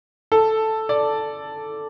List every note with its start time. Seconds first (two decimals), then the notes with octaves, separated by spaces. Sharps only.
0.32 A4
0.89 D5